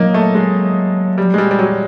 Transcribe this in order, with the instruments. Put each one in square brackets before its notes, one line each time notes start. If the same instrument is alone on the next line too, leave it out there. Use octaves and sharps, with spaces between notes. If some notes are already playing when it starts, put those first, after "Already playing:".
Already playing: [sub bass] F#3 [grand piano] A#3 D#4
[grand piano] A3
G#3
G3
G#3
G3
G3
F#3